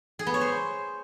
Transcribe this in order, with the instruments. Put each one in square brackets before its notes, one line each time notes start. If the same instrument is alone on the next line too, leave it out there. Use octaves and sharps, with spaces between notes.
[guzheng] G#4
B3
C#5
C5